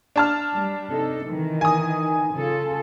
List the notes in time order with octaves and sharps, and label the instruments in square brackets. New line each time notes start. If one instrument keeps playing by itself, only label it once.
[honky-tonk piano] D4 A5 F6
[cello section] G3
C3 D#4 A4
D#3 E3
[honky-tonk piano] G#5 D#6
[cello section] C#3 F4 A4